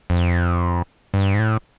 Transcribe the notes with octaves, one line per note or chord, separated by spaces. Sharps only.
F2
G2
G#2
A2